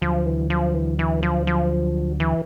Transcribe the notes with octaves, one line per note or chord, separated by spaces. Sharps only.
D2 D3 F3 F#3
E3
F3
E3
E3
F3
F3
E3